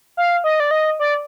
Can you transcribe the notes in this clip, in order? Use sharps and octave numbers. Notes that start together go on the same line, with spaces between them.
F5
D#5
D5
D#5
D5